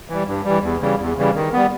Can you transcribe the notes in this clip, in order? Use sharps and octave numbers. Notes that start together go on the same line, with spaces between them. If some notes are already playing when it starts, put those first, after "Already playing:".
E3 G3
G2
E3 G3
E2
C#3 E3 G3
E2
C#3 E3 G3
D#3
G3 B3